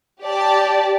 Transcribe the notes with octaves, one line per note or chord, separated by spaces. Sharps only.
G4 D5 A5